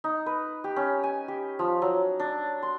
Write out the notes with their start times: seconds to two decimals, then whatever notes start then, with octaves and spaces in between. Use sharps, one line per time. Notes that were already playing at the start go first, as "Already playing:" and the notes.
0.04 D#4
0.26 B4
0.64 G4
0.76 C#4
1.03 G#5
1.28 G4
1.59 F3
1.82 F#3
2.19 D4
2.63 C6